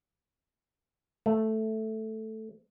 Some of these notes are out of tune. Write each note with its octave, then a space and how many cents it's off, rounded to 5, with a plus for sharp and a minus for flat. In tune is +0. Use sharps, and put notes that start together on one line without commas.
A3 +0